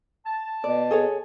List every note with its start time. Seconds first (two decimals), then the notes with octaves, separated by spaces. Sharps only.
0.25 A5
0.64 B2 D5
0.91 G#4 A4 C#5